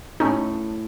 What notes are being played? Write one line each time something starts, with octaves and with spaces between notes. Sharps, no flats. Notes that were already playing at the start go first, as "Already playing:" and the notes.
A2 A3 C#4 D#4